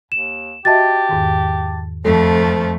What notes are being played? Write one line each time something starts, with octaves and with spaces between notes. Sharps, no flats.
D#2 E7
F#4 G4 D#5 E5 A5 A6
E2 G#2 D#3
F2 F3 A3 A4